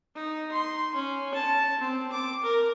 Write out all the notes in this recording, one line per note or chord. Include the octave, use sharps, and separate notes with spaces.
D#4
C6
C#4
A5
C4
D6
A#4